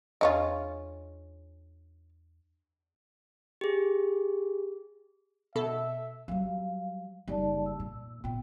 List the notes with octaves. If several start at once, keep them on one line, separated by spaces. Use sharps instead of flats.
E2 G#3 C#4 F4 D#5
G4 G#4
B2 A4 E5
F#3 G3 F5
F#1 G3 D#4 D5 A5
E6
A#2
A#2 B3 F4 G5